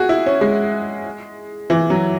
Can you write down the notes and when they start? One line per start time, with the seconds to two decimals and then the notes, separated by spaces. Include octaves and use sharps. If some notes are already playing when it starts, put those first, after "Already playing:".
Already playing: F#4 G#4
0.09 E4
0.26 C#4
0.41 G#3
1.70 E3
1.90 F#3